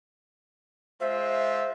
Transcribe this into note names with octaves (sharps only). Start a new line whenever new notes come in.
G#3 F4 C5 E5